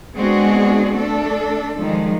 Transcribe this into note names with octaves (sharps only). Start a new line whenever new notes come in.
G#3 B3 C4 D4 F#4 G#4
A3 D4 A4
D#3 F3 G3 G#3